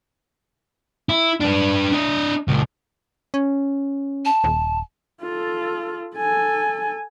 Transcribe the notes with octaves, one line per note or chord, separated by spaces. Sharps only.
E4
D4 B4
D4 D#5
C#2 A#2
C#4
A5
D#1
F4 A4
A4 G#5